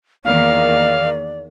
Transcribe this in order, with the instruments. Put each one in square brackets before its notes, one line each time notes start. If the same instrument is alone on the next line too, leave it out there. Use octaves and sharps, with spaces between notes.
[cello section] E2 D#3 A#3 [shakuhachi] D5 [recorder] F5